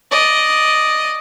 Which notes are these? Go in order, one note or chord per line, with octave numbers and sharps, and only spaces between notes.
D5 D#5